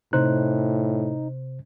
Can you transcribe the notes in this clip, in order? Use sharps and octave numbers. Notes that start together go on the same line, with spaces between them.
A2 C3 D#4 C5 F#6